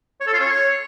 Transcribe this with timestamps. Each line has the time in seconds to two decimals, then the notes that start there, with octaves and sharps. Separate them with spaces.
0.21 C#5
0.27 A4
0.33 F4
0.39 C#5